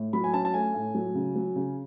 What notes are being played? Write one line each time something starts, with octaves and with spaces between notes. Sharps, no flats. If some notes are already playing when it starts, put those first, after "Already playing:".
Already playing: A2
F#3 B5
G#5
C#4 A5
A5
A3 G#5
A2
F#3
C#3
F#3
C#3